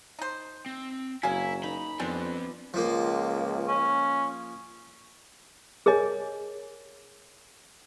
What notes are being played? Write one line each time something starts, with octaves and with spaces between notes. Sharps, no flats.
D#4 C5
C4
F#1 F#3 A#3 E4 G#4 F5 G#5
D#4 B5
F2 F3 G3 G#3 B3 C4 D4 C5
C#2 F3 A#3
C#4
G#4 A#4 C#5 D#5 G#5